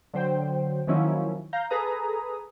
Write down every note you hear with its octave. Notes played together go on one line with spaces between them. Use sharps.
D3 F#3 C5 G5
D#3 F3 F#3 A#3 C#4 E4
F5 A#5 G6
G#4 A4 B4 A#5 D#6